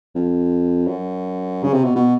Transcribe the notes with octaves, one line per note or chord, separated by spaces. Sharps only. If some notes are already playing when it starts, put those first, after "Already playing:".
F2
F#2
C#3
C3
B2
B2